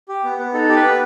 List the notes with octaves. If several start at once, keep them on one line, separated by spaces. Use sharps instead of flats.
G4
B3
B3
D#4 A4
G4
B4
B3